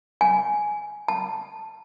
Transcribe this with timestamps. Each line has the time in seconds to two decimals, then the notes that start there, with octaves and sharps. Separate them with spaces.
0.21 G#5
1.08 A5